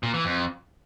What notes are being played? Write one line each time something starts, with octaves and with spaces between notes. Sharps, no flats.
A#2
E3
F2